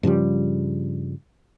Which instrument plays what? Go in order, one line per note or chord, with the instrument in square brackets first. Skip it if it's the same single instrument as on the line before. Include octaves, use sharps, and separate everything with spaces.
[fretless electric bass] G2 C#3 F3 G3